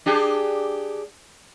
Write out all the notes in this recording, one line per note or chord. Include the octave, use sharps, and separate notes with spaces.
D4 G4 G#4